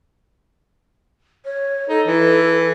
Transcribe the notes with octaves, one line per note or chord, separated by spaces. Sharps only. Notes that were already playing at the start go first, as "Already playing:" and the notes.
C#5
D#4 A4
E3